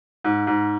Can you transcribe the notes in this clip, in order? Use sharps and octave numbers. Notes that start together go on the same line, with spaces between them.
G#2
G#2